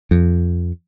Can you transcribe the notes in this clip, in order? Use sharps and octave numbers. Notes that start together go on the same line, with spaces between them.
F2